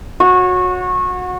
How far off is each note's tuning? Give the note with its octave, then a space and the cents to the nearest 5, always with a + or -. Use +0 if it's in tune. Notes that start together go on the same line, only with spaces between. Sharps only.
F#4 -25 C#5 +0